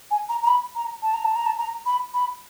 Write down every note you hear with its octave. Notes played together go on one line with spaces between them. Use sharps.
G#5
A#5
A#5
B5
A#5
A5
A#5
A5
A#5
A5
A#5
B5
B5